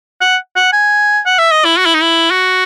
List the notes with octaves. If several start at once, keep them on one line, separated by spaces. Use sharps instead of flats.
F#5
F#5
G#5
F#5
E5
D#5
E4
F#4
E4
D#4
E4
F#4